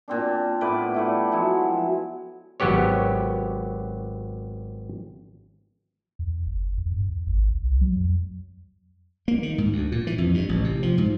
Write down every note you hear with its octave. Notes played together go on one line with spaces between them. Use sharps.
A#2 C4 D4
A2 B3 B4 D6
G3 A3 E4
F3 F#3 G#3 E4
G#1 F#3 B3 G4 C#5
E2
F#1
E2
G2
E2
G#1
C2
F#3
F2
A#3
D#3
G#2
D2
A#2
E3
F2
G2
A1
C3
F3
G#2